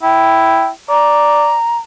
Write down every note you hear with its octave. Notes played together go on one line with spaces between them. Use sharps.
E4 G5
D5 A#5